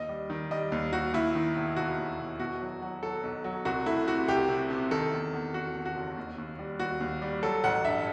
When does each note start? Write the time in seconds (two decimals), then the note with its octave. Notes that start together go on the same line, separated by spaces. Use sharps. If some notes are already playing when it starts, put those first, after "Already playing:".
Already playing: D#2 D#5
0.09 G3
0.30 D#3
0.51 G3 D#5
0.72 D#2
0.92 D#2 F#4
1.13 D#2 E4
1.35 D#3
1.56 E1
1.76 E1 F#4
1.98 D#2
2.19 E1
2.39 B2 F#4
2.61 F#3
2.81 F#3
3.03 F#3 A4
3.23 B1
3.44 F#3
3.65 C2 F#4
3.86 A3 E4
4.07 C3 F#4
4.28 C2 G4
4.49 C3
4.70 C3
4.91 D#3 A4
5.12 E2
5.33 E2
5.54 E2 F#4
5.75 E2
5.85 F#4
5.96 F#1
6.17 D#2
6.38 D#2
6.59 G3
6.80 D#2 F#4
7.01 D#2
7.22 G3
7.43 F#3 A4
7.64 A1 F#5
7.84 G2 E5